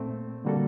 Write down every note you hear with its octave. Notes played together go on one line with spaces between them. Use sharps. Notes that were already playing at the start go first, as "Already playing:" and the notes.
Already playing: A#2 A3 C4
D3 G3 A#3 F#4 A4